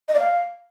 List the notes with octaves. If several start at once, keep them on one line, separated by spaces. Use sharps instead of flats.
D#5
D5
F5